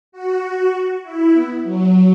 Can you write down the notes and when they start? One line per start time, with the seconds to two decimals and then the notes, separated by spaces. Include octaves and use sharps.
0.12 F#4
1.03 E4
1.33 B3
1.64 F#3